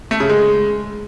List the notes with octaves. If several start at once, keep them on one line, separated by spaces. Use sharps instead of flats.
A3
C#3
G#3